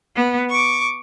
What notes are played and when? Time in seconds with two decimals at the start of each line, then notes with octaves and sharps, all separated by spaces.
0.15 B3
0.49 C#6 D6